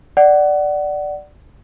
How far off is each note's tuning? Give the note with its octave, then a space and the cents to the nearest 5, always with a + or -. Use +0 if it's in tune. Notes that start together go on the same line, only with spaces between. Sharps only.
D5 +5 F#5 +20